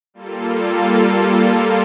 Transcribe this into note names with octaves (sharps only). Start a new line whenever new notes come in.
G3 A#3 F4 A4